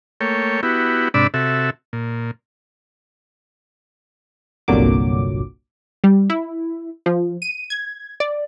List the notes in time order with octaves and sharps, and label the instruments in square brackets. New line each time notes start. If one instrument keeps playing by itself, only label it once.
[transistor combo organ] A3 A#3 C#5 G5
B3 E4 F#4 G4
G#2 C3 D4 D5 B5 E6
C3 F#4 A4 E5
A#2
[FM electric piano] G1 C2 A#2 D3 F#3 D6
[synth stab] G3
E4
F3
D#7
G#6
D5